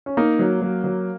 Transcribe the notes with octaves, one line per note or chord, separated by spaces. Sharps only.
C#4
A#3 D#4
F#3
F#3
F#3